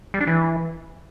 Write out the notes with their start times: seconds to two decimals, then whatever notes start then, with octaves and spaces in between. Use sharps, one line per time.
0.14 G3
0.21 D4
0.27 E3